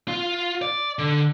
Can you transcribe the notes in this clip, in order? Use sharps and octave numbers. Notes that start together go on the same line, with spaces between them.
F4
D5
D3